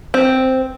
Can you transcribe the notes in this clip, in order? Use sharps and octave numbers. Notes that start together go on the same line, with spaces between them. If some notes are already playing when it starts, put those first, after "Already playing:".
C4